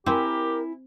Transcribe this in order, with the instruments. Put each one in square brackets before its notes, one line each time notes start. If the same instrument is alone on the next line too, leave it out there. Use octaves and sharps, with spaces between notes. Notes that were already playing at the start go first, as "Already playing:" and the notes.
[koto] C4 [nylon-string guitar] E4 G#5 [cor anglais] G4 [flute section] A#4